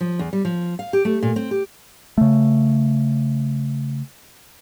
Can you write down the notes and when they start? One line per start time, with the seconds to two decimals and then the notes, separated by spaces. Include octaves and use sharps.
0.01 F3
0.19 E2
0.33 G3
0.45 F3
0.79 F5
0.93 G4
1.05 A3
1.22 A#2
1.36 C4
1.51 G4
2.18 C#3 A3